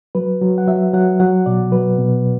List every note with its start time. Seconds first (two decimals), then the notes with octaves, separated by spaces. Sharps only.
0.15 F#3 B4
0.42 F#3
0.58 F#5
0.67 F#3 E5
0.93 F#3 F#5
1.20 F#3 F#5
1.46 B2 D5
1.72 F#3 B4
1.98 B2